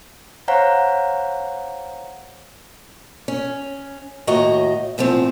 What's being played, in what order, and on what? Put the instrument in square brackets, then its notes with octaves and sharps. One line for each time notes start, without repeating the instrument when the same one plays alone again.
[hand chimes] C5 C#5 F5 F#5 A#5
[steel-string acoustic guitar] C#4
D#2 A2 F#4 D#5 A#5
E2 A2 F3 C4